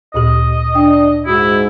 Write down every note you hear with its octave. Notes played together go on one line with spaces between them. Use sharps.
D2 A#2 G4 D#5
D4 G5
G#2 E4 F#4